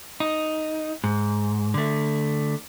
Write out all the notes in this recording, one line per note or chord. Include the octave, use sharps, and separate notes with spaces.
D#4
G#2
D3 A3